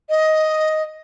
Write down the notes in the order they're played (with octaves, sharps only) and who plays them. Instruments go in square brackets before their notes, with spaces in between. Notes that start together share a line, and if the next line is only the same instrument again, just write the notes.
[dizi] D#5